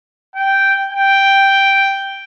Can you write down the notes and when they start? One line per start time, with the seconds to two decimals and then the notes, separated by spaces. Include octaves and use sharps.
0.36 G5
0.91 G5